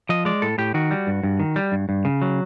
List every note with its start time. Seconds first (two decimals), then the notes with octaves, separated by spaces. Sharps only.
0.09 F3 D#5
0.25 G#3 D5
0.42 A2 A4
0.58 A2 G4
0.74 D#3 F#4
0.91 G3
1.07 G2
1.23 G2
1.40 D#3
1.56 G3
1.72 G2
1.89 G2
2.05 C#3
2.22 F#3